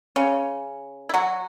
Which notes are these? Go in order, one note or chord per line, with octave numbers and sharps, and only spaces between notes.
C#3 C#4
E4
F#3 F#4